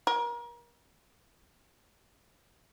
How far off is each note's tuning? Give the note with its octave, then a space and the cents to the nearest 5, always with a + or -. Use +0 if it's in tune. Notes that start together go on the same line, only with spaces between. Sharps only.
A#4 +35